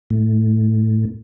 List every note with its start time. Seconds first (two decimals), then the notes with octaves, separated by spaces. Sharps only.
0.10 A2